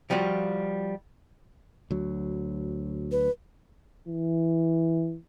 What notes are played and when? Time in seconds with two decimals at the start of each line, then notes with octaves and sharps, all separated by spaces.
0.10 F3 G3 F4 F#4
1.91 D2 F#3
3.11 B4
4.08 E3